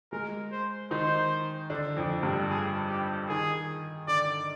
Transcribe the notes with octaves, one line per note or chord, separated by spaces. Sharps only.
G#3 G#4 A#4
C5
D#3 D#4 C5
D3 D4
F2 F3
G2 G3
G#4
G4
D#3 G#4
D3 D5